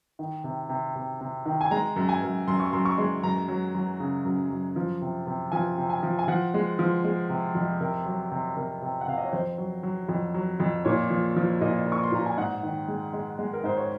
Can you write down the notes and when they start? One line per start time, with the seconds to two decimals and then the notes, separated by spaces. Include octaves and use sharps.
0.19 D#3
0.44 C3
0.69 C3
0.95 C3
1.21 C3
1.46 D#3
1.61 G#5
1.71 G#3 A#5
1.96 F#2
2.09 G#5
2.23 F#2
2.47 F#2 C6
2.60 C#6
2.73 F#2 C6
2.85 C#6
2.98 G#3 C6
3.23 F#2 A#5
3.48 F#3
3.75 F#3
4.00 C#3
4.25 F#2
4.50 F#2
4.76 F3
5.01 C3
5.27 C3
5.52 F3 G#5
5.77 C3
5.90 G#5
6.03 F3
6.19 G#5
6.28 F3 F#5
6.54 G#3
6.79 F3
7.04 G#3
7.29 C3
7.55 F2
7.80 C3 A#4
8.06 F#3
8.31 C3
8.56 C3 A#4
8.82 C3
9.01 F#5
9.08 C3 F5
9.18 D#5
9.25 C#5
9.33 F2 C5
9.58 F#3
9.83 F#3
10.09 F2
10.34 F#3
10.60 F2
10.85 A#2 C#5
11.10 F3
11.36 F3
11.61 A#2 D#5
11.86 A#2
11.92 C#6
12.03 C6
12.12 A#2 A#5
12.26 G#5
12.37 G#2 F#5
12.63 D#3
12.88 G#3
13.13 G#3
13.39 G#3
13.53 A#4
13.64 G#2 C5
13.77 C#5